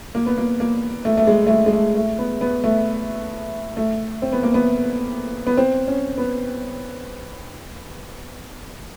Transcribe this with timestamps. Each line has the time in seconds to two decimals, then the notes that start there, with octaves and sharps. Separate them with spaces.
0.15 A#3
0.26 B3
0.38 A#3
0.60 A#3
1.05 A3
1.18 A3
1.27 G#3
1.47 A3
1.50 G#3
1.66 G#3
1.73 A3
1.95 A3
2.19 B3
2.41 B3
2.64 A3
3.77 A3
4.22 C4
4.32 B3
4.43 A#3
4.54 B3
5.47 B3
5.57 C4
5.87 C#4
6.18 B3